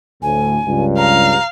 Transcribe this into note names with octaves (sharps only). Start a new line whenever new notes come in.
D2 A2 G#5
C#2 G2
F5 A#5